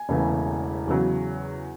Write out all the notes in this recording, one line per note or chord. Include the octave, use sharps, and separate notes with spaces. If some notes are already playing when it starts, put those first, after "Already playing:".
Already playing: G#5
E1 E2 C#3 E3 A3
E2 C#3 F#3